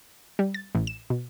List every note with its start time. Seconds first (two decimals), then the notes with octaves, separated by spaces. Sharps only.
0.39 G3
0.54 A6
0.75 A1
0.87 E7
1.10 B2